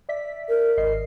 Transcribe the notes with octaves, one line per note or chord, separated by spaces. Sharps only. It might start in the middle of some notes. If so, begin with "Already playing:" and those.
D5 E5 B6
A#4
G#1 D#5 C7